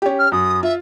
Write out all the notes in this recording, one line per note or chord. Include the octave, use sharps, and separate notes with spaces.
C#4 G4
F6
F#2 D#6
F4 E5